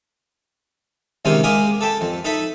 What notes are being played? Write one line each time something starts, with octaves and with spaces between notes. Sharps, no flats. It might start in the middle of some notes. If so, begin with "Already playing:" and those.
C#2 C3 D#3 A#3 C4 D#4
G#3 A#3 G4 A#4 D#6
A4 B4 G5 A5
F2
D#4 A4 E5 B5